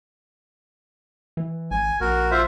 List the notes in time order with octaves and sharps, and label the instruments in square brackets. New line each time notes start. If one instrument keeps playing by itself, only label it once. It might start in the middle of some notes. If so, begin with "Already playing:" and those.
[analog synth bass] E3
[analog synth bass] G#1 [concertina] G#5
[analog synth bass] A#1 [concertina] F#4 A#4
[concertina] F4 C5 E5